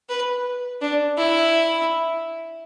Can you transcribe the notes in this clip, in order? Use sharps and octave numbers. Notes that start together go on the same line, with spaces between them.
B4
D4
E4